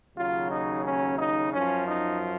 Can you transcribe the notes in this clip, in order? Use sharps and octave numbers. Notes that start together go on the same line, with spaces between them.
D#2 C#3 F#3 F4
D#4
C#4
D#4
F#2 F3 C#4
D#4